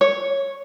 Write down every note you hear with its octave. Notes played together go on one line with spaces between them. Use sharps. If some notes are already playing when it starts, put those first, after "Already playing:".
C#5